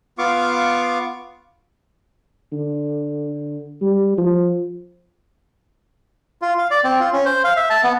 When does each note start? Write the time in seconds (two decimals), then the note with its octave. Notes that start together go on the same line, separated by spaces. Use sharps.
0.18 B3 F4 F5 C#6 D6
2.52 D3
3.82 G3
4.18 F3
6.42 F4
6.58 F5
6.71 D5
6.84 C4
7.00 F4
7.12 C#4
7.25 C5
7.44 F5
7.57 E5
7.70 A5
7.83 B3